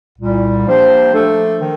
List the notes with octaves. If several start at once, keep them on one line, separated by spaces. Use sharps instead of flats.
C2 A#2 G3
F3 A#3 D4 G4 C5
F3 A3 D4 A4
D#3